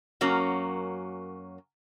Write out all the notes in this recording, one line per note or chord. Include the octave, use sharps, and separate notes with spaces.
F#2 F#3 A#3 C#4